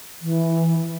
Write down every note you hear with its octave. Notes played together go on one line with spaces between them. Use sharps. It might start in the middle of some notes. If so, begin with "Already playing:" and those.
E3